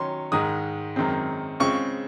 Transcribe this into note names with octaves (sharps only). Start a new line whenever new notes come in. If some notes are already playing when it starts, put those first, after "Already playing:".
Already playing: D#3 F#3 C#4 C6
G#2 D#3 G#3 D#6
F#2 D#3 G#3 C4
C#3 G#3 C4 F4 C#6